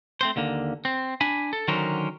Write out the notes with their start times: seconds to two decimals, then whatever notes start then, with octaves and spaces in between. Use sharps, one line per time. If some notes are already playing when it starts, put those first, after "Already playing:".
0.21 A3 C4 C5
0.36 D#2 D3 A#3
0.85 C4
1.21 D4 G#5 B5
1.53 A4
1.68 D3 D#3 F#3 C#4 A#4 C5